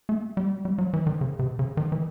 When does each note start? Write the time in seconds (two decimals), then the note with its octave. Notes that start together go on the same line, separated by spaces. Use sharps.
0.09 A3
0.37 G3
0.65 G3
0.78 F#3
0.93 E3
1.07 D#3
1.21 C#3
1.39 C3
1.59 C#3
1.77 D#3
1.92 E3